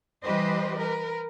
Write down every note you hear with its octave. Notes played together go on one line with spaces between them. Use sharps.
E3 G3 G4 B4 C5 D#5
A#4 B4